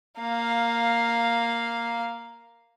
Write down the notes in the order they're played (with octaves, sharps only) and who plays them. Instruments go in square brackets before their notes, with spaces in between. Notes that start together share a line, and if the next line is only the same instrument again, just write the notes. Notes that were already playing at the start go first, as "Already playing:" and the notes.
[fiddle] A#3 F5